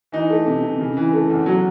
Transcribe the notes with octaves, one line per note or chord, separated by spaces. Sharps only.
E3 D#4
A3
C3
C3
C#3
E3
A3
E2
F#3